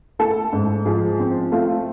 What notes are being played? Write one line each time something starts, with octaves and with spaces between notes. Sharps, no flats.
A3 A4
G#2
F3 G#4
C4
A3 F4